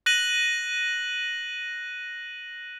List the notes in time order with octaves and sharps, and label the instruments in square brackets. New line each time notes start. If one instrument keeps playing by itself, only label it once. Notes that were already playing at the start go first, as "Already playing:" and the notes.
[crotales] F#6 A#6 D#7 F#7